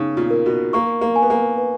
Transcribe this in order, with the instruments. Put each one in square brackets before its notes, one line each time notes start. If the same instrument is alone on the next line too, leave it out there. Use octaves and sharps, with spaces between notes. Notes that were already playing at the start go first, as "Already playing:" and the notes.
Already playing: [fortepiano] C#3 [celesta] D#4
[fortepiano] A#2
[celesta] A#4
[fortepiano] B2
[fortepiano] A#3 [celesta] C#6
[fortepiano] A#3
[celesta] G#5
[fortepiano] B3
A#3
[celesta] B4